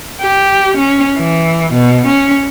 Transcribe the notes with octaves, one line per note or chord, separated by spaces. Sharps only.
G4
C#4
E3
B2
C#4